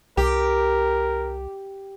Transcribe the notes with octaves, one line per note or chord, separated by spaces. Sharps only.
C2 G4 A#4